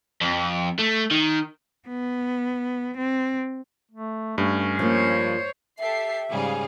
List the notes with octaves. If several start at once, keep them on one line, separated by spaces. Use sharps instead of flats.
F2
A3
D#3
B3
C4
A3
G2 A3 C#4
F3 A#3 C5 C#5
G4 A4 E5 C7
G#2 C#3 G3 G#4 F5